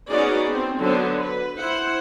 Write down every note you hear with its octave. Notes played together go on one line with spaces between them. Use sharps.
B3 C#4 D#4 F#4 G#4 D5
C4
D3 F#3 B3 C5
B4
E4 C5 F#5